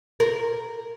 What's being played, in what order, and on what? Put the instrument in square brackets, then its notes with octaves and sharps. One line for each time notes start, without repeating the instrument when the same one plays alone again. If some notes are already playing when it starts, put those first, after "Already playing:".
[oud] A#4